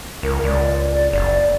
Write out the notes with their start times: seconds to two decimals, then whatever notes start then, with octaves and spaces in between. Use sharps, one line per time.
0.23 C#2 A#4
0.44 C#2 D5
0.92 D5
1.13 F#1 D5